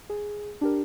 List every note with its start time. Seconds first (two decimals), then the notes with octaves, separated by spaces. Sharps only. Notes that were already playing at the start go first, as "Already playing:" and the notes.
0.10 G#4
0.61 D4 G4 A#4